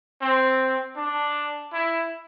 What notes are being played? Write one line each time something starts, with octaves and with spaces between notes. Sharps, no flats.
C4
D4
E4